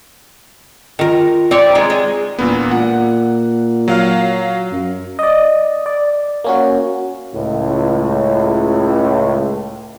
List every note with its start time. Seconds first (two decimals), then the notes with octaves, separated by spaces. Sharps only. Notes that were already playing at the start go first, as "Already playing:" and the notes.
0.99 D#3 F4 A#4
1.51 C4 C#5 D5
1.75 D#3 G#3 G#4
1.90 G#3
2.39 E1 A#2 A#3 B3
2.71 A#2 F#5
3.88 F#3 F5 F6
4.71 F#2
5.19 D5 D#5
5.86 D5
6.44 A#3 C#4 F#4
7.34 C#2 A2